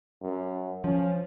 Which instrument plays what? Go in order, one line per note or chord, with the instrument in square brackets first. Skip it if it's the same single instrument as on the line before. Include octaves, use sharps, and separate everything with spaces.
[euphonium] F#2
[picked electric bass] F3 [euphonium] C#4